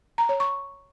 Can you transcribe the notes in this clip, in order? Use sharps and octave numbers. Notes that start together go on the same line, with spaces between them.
A#5
C#5
C#6